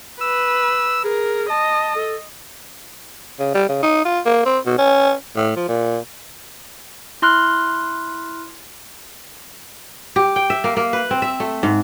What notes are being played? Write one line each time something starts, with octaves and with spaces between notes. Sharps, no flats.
B4 E6
G#4 A#4
D#5 A5
A4
C#3
G3
C#3
D#4
F4
A#3
C4
B2
C#4
A2
F3
A#2
E4 C6 F6 F#6
G4
G5
E5
A#3
A#3
B4
C4
E5
A3
G#2